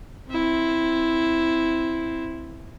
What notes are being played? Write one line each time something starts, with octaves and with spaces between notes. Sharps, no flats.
C4 E4